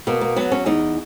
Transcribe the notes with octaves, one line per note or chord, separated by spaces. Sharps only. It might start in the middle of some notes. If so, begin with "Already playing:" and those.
B2 A#3
A#3
F#3 B3
C#4
E2 D#4